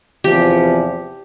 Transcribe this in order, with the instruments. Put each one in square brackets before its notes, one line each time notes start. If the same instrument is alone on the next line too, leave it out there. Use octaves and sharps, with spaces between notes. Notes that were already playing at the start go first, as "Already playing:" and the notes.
[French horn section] E2 C3 F3 [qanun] G4